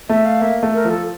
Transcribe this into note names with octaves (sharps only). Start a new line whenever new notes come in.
A3 E5
F5
A#3 E5
A3
A#4
F3
A4